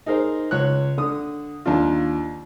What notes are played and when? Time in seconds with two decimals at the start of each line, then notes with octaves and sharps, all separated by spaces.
0.06 D#4 G#4 A#4 C5
0.51 C#2 C#5 F#6
0.98 D3 D#6
1.65 D#2 D4 F4